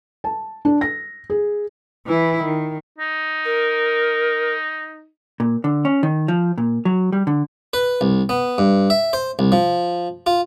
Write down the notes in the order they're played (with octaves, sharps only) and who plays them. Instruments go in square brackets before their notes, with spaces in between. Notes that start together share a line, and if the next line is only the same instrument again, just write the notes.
[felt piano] A5
D4
A#6
G#4
[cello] E3 E4
D#3
[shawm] D#4
[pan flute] A#4
[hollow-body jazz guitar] A#2
D3
C#4
D#3
F3
A#2
F#3
G3
D3
[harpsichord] B4
C2
B3
G2
E5
C5
C2
F3
F4